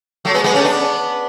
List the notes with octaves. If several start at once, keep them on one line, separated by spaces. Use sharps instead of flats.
F#3 A3
G#3 B3
G#3 B3
A3 C#4
B3 D4